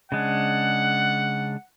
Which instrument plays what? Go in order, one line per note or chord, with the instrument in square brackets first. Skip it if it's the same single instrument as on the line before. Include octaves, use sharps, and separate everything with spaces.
[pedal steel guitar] C#3 G#3 D4 [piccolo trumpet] F#5